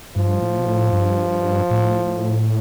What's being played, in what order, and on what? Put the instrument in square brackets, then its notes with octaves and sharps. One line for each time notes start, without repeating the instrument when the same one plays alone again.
[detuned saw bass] G2 [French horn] F3
[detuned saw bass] A2
B2
A2
G2
A2